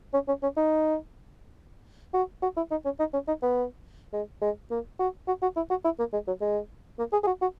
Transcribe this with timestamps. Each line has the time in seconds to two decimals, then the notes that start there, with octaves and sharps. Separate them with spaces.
0.13 C#4
0.28 C#4
0.43 C#4
0.56 D#4
2.14 F#4
2.42 F#4
2.57 E4
2.71 D#4
2.85 C#4
2.99 D#4
3.13 C#4
3.28 D#4
3.42 B3
4.13 G#3
4.42 G#3
4.71 A#3
4.99 F#4
5.27 F#4
5.42 F#4
5.56 E4
5.70 F#4
5.84 E4
5.99 A#3
6.13 G#3
6.27 F#3
6.41 G#3
6.99 A#3
7.13 G#4
7.23 G#4
7.27 F#4
7.42 F#4